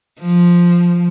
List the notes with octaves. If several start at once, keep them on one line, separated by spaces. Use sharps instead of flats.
F3